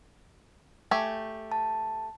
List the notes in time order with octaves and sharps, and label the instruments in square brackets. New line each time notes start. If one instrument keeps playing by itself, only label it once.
[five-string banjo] A3 G4 G#5
[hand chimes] A5